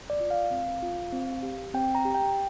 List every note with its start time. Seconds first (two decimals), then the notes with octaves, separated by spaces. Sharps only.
0.10 D5
0.21 F4
0.31 F5
0.51 C4
0.82 F4
1.12 C4
1.43 G4
1.74 C4 G5
1.95 A#5
2.05 G4
2.15 G5